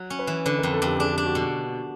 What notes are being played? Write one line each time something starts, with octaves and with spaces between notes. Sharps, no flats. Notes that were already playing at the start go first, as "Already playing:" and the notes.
Already playing: F#3
C#4
B4
E3
D3 B4
A#4
F2
A4
F2 G4
D4 G#4
G4
D4
F#4
B2